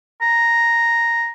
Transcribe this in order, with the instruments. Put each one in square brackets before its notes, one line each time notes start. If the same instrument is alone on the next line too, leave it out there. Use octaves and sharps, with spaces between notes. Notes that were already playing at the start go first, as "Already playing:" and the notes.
[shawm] A#5